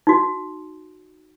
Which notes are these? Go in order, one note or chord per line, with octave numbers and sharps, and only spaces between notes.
D#4 F#4